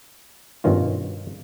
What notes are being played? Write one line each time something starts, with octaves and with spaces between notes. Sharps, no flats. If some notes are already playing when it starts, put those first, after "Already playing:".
G2 B2 D#3 C#4 F4